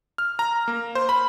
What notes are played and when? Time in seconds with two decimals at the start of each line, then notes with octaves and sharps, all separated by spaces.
0.18 F6
0.39 A#5
0.68 A#3
0.95 C5
1.09 B5